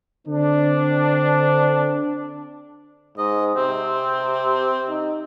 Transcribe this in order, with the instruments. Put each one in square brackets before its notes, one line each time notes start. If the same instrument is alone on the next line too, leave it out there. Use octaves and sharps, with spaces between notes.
[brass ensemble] D3 C4 D4
[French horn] G#2 [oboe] D#5
[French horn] C3 [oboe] C4
[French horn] D#4